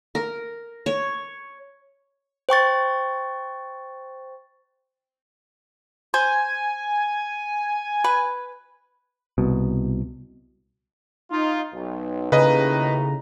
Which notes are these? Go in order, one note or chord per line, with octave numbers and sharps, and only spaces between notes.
A#4
C#5
C5 G5 C#6 A6
C5 G#5
B4
C2 B2
D#4 F4
B1
D#2 A2 C#3 B4 D#5 A#5